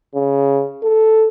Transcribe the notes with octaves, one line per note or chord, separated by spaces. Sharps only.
C#3
A4